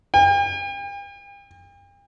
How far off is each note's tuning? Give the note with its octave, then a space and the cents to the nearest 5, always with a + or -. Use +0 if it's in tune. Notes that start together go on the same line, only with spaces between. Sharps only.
G5 +40